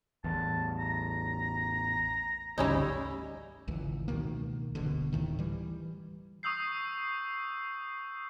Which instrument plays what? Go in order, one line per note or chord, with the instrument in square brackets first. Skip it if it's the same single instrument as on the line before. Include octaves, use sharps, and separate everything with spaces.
[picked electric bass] A1 E2 [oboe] A5
[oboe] A#5
[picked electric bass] G#1 D2 C#3 [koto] G3 C#4 D#4 [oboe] E4
[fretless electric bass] G#1 C#2 E3
C#2 B2 D#3 A#3
D1 G1 B2 D3
D2 A2 D#3
E3 G3
[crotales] C#6 D#6 E6 G6 C7